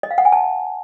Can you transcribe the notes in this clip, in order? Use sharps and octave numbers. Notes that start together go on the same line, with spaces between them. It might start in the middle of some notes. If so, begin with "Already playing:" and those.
D#5
F5
F#5
G#5
A5